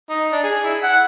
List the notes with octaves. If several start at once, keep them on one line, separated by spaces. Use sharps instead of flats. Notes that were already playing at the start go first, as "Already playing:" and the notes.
D#4
D4
G#4
E4
F#5